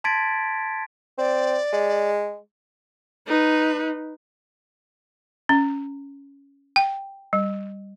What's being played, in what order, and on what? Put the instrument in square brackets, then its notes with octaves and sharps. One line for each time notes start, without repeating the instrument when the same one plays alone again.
[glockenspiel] A5 C6 G#6 A6 B6 D7
[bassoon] C4 [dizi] D5
[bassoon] G#3
[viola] D#4 B4
[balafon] C#4
G5
G3